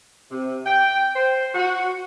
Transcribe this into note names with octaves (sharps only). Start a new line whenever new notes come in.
C3
G5
C5
F#4